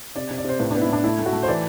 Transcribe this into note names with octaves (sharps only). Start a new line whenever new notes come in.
C3 D5
C3
D5
C3 C5
A2 B4
D4
B3
E4
A2 D4
A3 E4
A3
F#4
A3
C5
E3 D5